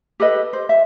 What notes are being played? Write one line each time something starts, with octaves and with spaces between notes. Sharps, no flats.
G4 A4 B4 D#5
C5
E5